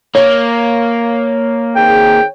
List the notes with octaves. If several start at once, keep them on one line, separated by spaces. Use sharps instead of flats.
A#3 C#5
D#3 C4 G#4 G5